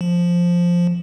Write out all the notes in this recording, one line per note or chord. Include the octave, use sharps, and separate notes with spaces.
F3